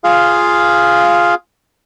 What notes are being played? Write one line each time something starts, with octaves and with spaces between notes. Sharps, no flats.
F4 G#4 F5